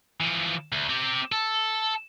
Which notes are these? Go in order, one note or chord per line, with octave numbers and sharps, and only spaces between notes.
E3 F3
D2
C4 G4
A4